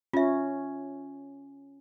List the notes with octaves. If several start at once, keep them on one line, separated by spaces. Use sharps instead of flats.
C#4 F4 E5